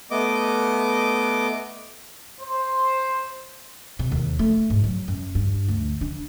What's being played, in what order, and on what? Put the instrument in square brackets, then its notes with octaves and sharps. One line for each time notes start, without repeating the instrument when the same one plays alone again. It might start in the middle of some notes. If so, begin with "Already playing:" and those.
[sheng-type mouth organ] A3 B3 D#5 D6
[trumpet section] C5
[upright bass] C3
D#2
A3
G#2
F#3
F#2
G2
D2
D4